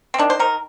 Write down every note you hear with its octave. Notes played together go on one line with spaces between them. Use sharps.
C4
D#3 D4
C5
D#3 A#4